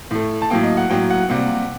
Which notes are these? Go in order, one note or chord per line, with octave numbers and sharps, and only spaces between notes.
A2 A3
A5
A2 F#3 A#3 G5
D#5
F#5
A2 F#3 A#3 G5
F#5
C3 G3 A#3 F#5